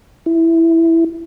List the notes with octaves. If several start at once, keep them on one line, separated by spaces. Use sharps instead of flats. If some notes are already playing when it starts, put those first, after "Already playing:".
E4